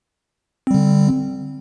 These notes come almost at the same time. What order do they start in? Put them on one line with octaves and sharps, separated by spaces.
C4 G3 D3